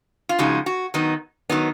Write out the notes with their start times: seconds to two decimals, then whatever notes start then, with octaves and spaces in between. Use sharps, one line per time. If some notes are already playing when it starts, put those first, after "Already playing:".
0.29 F4
0.39 C#3 F3 G#3 D#4 F#4
0.66 F#4
0.94 D#3 F#3 B3 D#4
1.49 D#3 F#3 B3 D#4